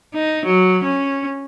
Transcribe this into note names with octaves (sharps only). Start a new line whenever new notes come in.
D#4
F#3
C#4